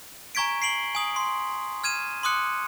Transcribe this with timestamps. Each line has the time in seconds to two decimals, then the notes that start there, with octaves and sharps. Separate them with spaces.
0.35 G#5 A#5 C#6 G#6 B6 D7
0.62 C7 D7 F#7 G7
0.95 G#5 D#6 F#7
1.16 C6
1.84 F6 G#6 D#7 E7
2.23 C6 D6 D#6 F#6 C#7